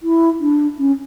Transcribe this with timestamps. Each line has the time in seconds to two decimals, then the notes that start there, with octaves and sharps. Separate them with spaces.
0.03 E4
0.41 D4
0.79 C#4